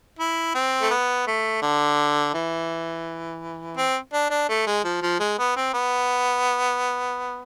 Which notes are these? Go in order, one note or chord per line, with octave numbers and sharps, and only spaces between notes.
E4
C4
A3
B3
A3
D3
E3
C4
D4
D4
A3
G#3
F3
F3
G#3
B3
C4
B3